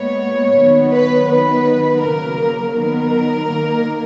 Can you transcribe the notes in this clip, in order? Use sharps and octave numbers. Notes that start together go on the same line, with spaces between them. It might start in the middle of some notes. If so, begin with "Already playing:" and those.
Already playing: A#2 G#3 B3 C#5
D#3 F#3 B3
B4
D#3 F#3 B3 B4
C#3 F#3 A#3 A#4
D#3 F#3 B3 A#4
D#3 A#3